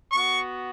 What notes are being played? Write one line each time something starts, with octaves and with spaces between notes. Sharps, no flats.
B3 F#4 C#6